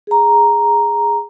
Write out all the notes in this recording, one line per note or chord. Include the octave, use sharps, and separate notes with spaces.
G#4 A#5